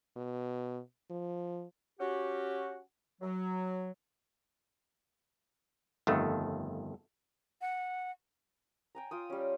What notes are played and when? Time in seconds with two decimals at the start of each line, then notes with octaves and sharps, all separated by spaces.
0.17 B2
1.10 F3
2.00 C#4 F#4 G4 F#5
3.22 F#3
6.07 G1 F2 D#3 A3
7.61 F#5
8.95 G5 G#5 A#5
9.11 F4 G5 D#6
9.30 G3 C#4